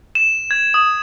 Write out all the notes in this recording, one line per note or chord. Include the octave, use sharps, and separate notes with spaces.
E7
G#6
D#6